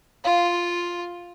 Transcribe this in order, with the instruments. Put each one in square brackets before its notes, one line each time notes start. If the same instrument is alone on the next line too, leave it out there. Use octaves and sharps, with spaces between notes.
[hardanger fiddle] F4 [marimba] F5